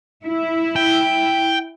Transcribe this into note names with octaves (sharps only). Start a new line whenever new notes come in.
E4
G5